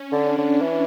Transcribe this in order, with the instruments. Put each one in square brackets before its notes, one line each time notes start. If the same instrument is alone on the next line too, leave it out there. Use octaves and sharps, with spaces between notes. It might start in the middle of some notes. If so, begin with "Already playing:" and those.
Already playing: [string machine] C#4
[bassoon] D3 [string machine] D4
[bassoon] D3
E3